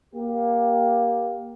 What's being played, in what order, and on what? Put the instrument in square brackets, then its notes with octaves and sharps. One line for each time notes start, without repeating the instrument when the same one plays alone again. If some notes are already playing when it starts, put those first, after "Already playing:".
[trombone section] A#3 G4